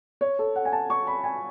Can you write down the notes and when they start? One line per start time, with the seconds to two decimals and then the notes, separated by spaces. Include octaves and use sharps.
0.21 C#5
0.39 A4
0.56 F#5
0.65 G#5
0.72 A5
0.90 C#6
1.07 B5
1.24 G#5